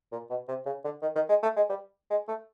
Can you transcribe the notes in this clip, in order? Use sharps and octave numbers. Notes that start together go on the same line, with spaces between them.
A#2
B2
C3
C#3
D3
D#3
D#3
G#3
A3
G#3
G3
G#3
A3